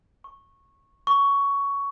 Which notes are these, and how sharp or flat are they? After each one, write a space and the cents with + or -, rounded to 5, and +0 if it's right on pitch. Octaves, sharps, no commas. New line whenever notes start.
C#6 -15
C#6 +15